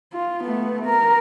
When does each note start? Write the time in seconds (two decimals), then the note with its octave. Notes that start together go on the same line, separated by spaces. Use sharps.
0.13 F4
0.44 A3 B3
0.86 A#4